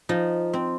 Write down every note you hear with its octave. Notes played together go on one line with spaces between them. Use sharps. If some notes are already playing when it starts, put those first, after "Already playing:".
F3 D#4
C4